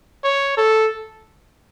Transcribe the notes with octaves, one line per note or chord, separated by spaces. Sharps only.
C#5
A4